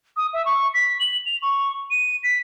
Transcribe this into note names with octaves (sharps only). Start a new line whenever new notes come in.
D#6
E5
C#6
B6
F#7
F7
C#6
D#7
B6